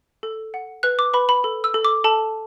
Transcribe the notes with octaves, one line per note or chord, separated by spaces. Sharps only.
A4
F#5
B4 F#6
D6
B4 B5
B5
A4
E6
A4
D6
A4 A5